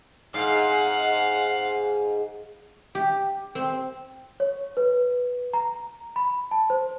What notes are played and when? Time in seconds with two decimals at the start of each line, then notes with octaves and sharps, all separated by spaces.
0.34 G#2 F5 F#5
2.95 G4
3.55 C4
4.40 C#5
4.77 B4
5.53 A#5
6.16 B5
6.51 A5
6.70 C5